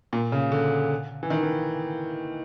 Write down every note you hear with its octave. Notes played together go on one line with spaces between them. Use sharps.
A#2
C#3
D3
E3
D#3
E3